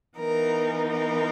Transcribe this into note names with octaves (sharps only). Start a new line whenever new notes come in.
E3 B3 D#4 A#4
A#4